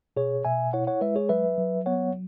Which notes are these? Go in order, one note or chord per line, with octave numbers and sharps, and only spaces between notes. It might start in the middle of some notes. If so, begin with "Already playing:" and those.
B2 G#4 C#5
B2 E5 G#5
E4 C#5 F#5
C#5 F#5
G#3 B4 E5
G#4 C#5
F#3 B4 E5
F#3
B3 C#5 F#5